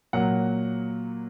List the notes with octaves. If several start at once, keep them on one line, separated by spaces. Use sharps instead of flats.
A#2 F#3 A#3 F#5